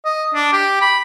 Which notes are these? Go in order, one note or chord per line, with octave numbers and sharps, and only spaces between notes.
D#5
D4
G4
B5